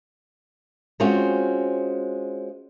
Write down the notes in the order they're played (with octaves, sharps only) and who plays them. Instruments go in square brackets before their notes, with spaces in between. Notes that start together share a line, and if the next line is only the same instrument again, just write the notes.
[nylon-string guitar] G#3 C4 C#4 F4 F#4